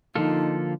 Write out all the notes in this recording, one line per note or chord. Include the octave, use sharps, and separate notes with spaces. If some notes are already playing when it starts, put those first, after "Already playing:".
D3 F3 A#3 D#4 F4 A4